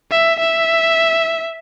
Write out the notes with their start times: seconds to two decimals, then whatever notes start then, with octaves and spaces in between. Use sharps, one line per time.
0.11 E5
0.40 E5